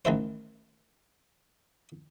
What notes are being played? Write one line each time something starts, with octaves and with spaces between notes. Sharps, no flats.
A1 D#3 E4 C5